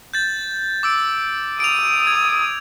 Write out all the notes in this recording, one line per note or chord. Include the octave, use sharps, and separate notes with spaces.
G6 A6
D6 E6 D7
D#6 D7 F7
G#6